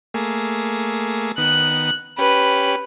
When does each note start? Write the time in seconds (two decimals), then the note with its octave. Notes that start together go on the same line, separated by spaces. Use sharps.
0.14 A3 A#3 G#4
1.38 D#3 B3 F#6
2.19 C#4 G4 B4